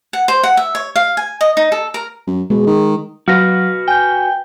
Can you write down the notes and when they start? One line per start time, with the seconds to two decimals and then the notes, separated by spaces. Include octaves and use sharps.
0.13 F#5
0.28 C5
0.43 F#5
0.57 E5
0.75 C#5
0.96 F5
1.17 G#5
1.41 D#5
1.57 D#4
1.72 A4
1.94 A#4
2.27 F#2
2.50 B2 G#3
2.67 D#3
3.28 F#3 F#4 B4 F5 F6 A#6
3.88 G5 G#5 G6